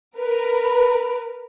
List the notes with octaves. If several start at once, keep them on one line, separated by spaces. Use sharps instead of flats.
A#4 B4